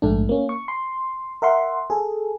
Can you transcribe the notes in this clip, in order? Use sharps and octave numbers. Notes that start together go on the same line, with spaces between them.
A#1 G#2 A3 D4
A#3 C#4
C#6
C6
A#4 E5 F#5 C6
G#4 A4